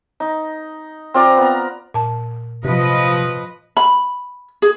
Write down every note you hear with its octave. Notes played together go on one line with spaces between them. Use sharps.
D#4
C4 F4 D5 A#5
B3 A#5
A#2 A5
C3 F3 B4 D#5
B5
G#4